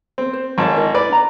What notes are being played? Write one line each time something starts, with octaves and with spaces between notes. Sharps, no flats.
C4
C5
G#1 C#5 F5 A5
E4 A#4 D#5
B4 D5
D4 A#5